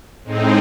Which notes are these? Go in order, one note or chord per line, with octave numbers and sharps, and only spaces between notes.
A2 G#3 C4 D#4